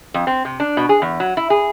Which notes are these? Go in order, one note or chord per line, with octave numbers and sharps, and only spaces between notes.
F2
C4
C3
D4
B2
G#4
E2
F#3
E4
G#4